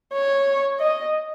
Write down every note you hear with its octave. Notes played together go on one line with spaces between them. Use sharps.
C#5
D#5